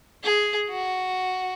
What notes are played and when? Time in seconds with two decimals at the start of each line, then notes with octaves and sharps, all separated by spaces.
0.23 G#4
0.69 F#4